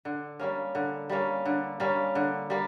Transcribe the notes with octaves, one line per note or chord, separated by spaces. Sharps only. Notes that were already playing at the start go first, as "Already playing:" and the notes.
D3
G3 A#3 C#4
D3
G3 A#3 C#4
D3
G3 A#3 C#4
D3
G3 A#3